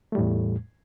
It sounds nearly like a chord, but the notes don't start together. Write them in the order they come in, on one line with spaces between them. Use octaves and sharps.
A3 G3 A2 E2